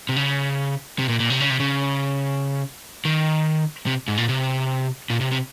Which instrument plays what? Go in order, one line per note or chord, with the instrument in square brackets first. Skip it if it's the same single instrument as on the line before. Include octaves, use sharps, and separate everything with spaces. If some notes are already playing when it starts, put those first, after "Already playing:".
[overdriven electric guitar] C3
C#3
C3
A#2
A#2
C3
C#3
C3
C#3
D#3
C3
G#2
A#2
C3
A#2
C3
C3